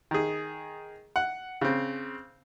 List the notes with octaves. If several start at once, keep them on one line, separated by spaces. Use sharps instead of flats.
D#3 G#4
F#5
C#3 C4